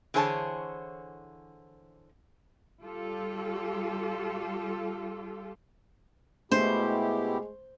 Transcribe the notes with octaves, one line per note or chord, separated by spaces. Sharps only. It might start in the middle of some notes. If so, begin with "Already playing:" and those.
D3 E3 G#4 C5 C#5 A5
G3 F4 G4 A4
B2 G#3 A3 E4 G4 C5